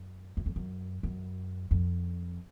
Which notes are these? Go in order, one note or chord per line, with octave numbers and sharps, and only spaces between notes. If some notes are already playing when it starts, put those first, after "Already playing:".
Already playing: F#2
F#2
F2
F#2
F#2
F2